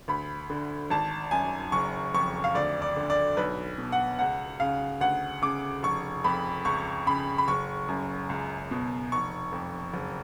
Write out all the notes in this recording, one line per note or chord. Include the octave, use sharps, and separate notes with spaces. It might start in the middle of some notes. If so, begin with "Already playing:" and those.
D2 B5
D3
G#1 A5
F#2 G#5
F#1 C#6
F2 C#6
F5
D2 D5
D5
D3
D5
B1 B4
B2
F#5
C#2 F#5
C#3 F5
D2 F#5
C#3 D6
F1 C#6
F2 B5
C#2 C#6
C#3 B5
B5
F#1 C#6
F#2
C#2
B2
F1 C#6
F2
F#1